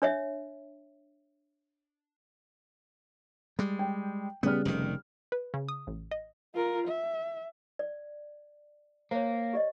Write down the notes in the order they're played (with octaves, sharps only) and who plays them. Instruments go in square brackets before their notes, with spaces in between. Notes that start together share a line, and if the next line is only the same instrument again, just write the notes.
[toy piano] D4 C#5 E5
[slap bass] G3 G#3
[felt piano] G5
[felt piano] C#3 G3 F6 [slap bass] B3
[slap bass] F1 C3 D#3
[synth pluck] B4
C#3
D#6
A1
D#5
[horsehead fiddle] F4 A#4
E5
[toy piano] D5
[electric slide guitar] A#3 [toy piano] C5 C#5
[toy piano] G4 D5 D#5